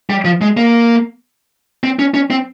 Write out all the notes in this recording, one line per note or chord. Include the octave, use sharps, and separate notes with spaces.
G3
F3
G#3
A#3
C4
C#4
C#4
C4